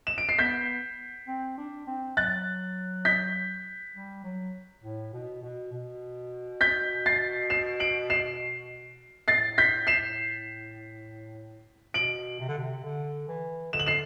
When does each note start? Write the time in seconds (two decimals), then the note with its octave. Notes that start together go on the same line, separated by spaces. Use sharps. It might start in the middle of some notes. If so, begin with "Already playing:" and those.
0.07 E7
0.18 D7
0.29 C7
0.38 B3 G6 B6
1.28 C4
1.58 D4
1.87 C4
2.17 F#3 F#6 A6
3.05 G6 B6
3.95 G3
4.24 F#3
4.83 A2
5.13 B2
5.43 B2
5.73 B2
6.61 G6 B6
7.06 A6 C7
7.50 C7 E7
7.80 D7 F#7
8.10 C7 E7
9.28 A2 A6 C7
9.58 G6 B6
9.87 C7 E7
11.94 B2 D7 F#7
12.39 C3
12.48 D3
12.57 C3
12.84 D3
13.28 E3
13.73 D3 E7
13.79 F#7
13.86 C7 E7